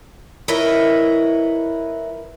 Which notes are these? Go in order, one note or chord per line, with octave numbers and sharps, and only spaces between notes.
E4 A#4 B4 C#5 D#5 E5